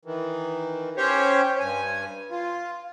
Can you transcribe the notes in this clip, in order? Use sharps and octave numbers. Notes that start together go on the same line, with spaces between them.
D#3 E3
C#4 G4 C5 C#5
G2 G#5
F4